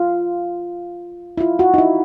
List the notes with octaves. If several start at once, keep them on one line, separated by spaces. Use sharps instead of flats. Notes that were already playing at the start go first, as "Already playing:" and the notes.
Already playing: F4
E4
F4
F#4
D#4
E4